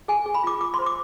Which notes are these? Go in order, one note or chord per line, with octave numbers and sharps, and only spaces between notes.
G#4 G#5
G#4
B5
F4 D6
F4 D6
C6
C5
D6